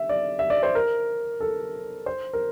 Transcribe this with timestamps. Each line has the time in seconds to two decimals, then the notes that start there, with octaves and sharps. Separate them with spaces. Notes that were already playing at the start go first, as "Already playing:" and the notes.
Already playing: E5
0.09 D5
0.39 E5
0.50 D5
0.63 C5
0.75 A#4
1.41 A4
2.06 C5
2.33 A#4